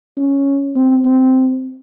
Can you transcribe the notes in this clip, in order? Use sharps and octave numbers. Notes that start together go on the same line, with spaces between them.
C#4
C4
C4